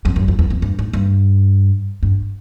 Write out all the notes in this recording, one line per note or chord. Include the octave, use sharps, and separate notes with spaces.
F2
F#2
F2
E2
F2
G2
G#2
G2
G2